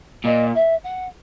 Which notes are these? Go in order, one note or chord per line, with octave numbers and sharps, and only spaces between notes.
A#2 D#5
E5
F#5